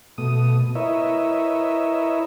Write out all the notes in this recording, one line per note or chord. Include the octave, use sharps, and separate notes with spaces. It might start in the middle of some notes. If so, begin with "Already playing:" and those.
B2 A3 D#6
E4 A#4 B4 C#5 D#5 E5